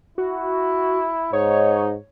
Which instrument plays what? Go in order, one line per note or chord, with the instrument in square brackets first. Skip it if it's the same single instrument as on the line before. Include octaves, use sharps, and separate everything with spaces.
[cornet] E4 [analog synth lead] F#4
[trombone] G#2 [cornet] D#4 [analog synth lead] C#5